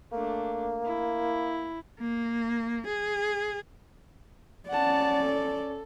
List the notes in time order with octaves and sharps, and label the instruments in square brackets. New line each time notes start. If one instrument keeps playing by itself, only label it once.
[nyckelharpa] A3 D4 [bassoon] A#3
[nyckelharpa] E4
[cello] A#3
G#4
[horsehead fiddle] C#4 D5 [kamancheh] F#5 A5
[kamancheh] A4